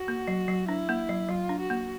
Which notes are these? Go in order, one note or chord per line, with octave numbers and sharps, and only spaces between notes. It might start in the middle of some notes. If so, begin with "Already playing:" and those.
Already playing: F#4
A#3
F#3
F#3
D4 E4
A#3
F#3
F#3 F4
D4
F#4
A#3